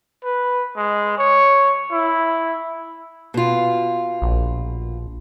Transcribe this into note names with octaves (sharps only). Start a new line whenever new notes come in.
B4
G#3
C#5
E4
B2 F4
A#1